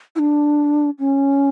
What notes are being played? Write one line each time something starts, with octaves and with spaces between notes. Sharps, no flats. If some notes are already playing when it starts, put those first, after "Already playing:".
E4
D4
C#4